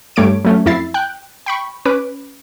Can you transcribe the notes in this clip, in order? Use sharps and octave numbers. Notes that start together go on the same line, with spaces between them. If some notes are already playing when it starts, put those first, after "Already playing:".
G2 G3 A3 C#5 D6 D7
F#3 A3 C#4
F2 E4 E5 A6 C7
G5 F#6 G6
G5 B5 C#6
C#4 B4 D6